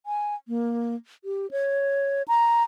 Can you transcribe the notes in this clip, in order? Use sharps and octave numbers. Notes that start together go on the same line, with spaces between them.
G#5
A#3
G4
C#5
A#5